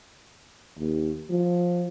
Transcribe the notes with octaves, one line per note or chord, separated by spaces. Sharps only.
D#2
F3